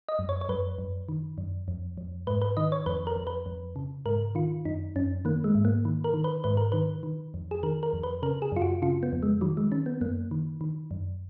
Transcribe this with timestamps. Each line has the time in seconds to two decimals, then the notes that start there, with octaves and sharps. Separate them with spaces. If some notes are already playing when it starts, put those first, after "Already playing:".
0.09 D#5
0.19 F#2
0.29 C#5
0.41 C#5
0.49 F#2 B4
0.78 F#2
1.09 D#3
1.38 F#2
1.68 F2
1.97 F2
2.27 G#2 B4
2.42 B4
2.57 D#3 D#5
2.72 C#5
2.86 F2 B4
3.07 A#4
3.16 F2
3.27 B4
3.46 F2
3.76 C#3
4.06 G#2 A#4
4.35 D#3 F4
4.65 F#2 D#4
4.96 F#2 C#4
5.25 D#3 A#3
5.44 G#3
5.55 G#2
5.65 A#3
5.85 D#3
6.04 A#4
6.14 D#3
6.24 B4
6.44 G#2 B4
6.57 A#4
6.72 D#3 B4
7.03 D#3
7.34 F2
7.51 G#4
7.63 D#3 A#4
7.83 A#4
7.93 F2
8.03 B4
8.23 C#3 A#4
8.42 G#4
8.52 F#2 F4
8.62 F#4
8.82 C#3 F4
9.03 B3
9.13 F2
9.23 G#3
9.41 D#3 F#3
9.57 G#3
9.72 D#3 C#4
9.86 B3
10.01 F#2 A#3
10.31 D#3
10.61 D#3
10.91 F#2